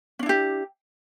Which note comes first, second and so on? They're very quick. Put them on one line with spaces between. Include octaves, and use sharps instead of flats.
C#4 D4 E4 G4